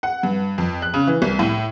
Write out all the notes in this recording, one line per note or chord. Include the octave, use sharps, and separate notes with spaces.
F#5
G2
F2
F#6
C#3
E3
C2
A2